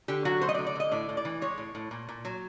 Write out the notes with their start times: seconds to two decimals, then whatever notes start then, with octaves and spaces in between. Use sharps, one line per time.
0.08 D3 G4
0.25 F#3 F#4
0.41 A3 C5
0.49 D#5
0.54 D5
0.58 D3
0.66 D5
0.75 D3 D#5
0.91 A2 D5
1.09 A2
1.17 D5
1.25 E3
1.42 G#3 C#5
1.58 A2
1.75 A2
1.91 A#2
2.09 A#2
2.25 F#3